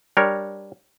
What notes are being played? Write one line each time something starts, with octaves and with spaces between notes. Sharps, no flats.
G3 D4 A#4 C#5